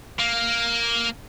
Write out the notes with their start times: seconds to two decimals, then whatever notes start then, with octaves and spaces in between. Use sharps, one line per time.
0.19 A#3